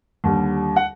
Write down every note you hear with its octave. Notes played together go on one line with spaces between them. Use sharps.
D#2 D3 G3
F#5